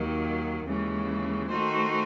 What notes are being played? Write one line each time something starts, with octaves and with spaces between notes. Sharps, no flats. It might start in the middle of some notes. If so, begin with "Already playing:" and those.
Already playing: D#2 D#3 F#3
D#2 C#3 E3 G#3
D#3 A3 D#4 F#4 C5